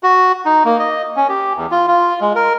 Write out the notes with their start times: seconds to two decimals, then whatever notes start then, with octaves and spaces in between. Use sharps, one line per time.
0.03 F#4
0.45 D#4
0.65 A#3
0.79 D#5
1.16 C#4
1.29 G4
1.56 E2
1.71 F4
1.88 F4
2.21 G#3
2.35 A#4